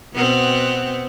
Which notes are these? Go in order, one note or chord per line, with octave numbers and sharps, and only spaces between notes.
B2 B3 C4